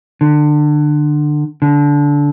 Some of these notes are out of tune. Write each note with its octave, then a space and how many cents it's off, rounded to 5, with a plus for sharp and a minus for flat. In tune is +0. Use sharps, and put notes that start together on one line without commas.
D3 +25
D3 -20